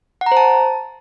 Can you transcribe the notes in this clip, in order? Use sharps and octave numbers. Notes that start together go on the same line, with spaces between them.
F#5
A#5
C5
A5